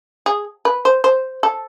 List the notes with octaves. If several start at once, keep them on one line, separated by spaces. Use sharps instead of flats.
G#4
B4
C5
C5
A4